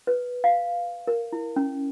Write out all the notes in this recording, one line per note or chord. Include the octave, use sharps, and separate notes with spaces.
B4
F5
A#4
E4
C#4